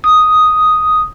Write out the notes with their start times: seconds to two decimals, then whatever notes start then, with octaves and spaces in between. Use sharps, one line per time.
0.04 D#6